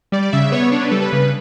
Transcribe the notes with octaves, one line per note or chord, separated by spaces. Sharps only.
G3 D5
D5
C#3 E5
B3 C#5
D4 C#5
B4
G3 A4
B4
C#3